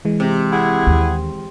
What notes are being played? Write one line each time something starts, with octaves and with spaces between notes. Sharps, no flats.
E3 G#3
C3
E4 G#4 F#5
D#2